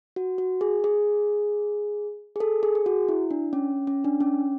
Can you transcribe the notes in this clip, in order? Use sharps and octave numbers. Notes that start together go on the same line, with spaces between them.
F#4
F#4
G#4
G#4
G#4
A4
G#4
G#4
F#4
E4
D4
C#4
C#4
D4
C#4